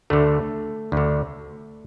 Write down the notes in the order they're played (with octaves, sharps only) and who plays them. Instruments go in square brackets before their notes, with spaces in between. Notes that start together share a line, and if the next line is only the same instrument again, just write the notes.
[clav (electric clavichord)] D2 D3 A3
D2 D3